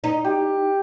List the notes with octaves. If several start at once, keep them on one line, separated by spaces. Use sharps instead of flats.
D#4
G4